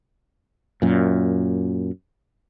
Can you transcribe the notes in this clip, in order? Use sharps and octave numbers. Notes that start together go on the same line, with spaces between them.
F#2 A#2